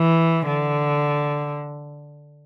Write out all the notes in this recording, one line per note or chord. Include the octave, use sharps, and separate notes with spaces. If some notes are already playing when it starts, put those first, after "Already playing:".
Already playing: E3
D3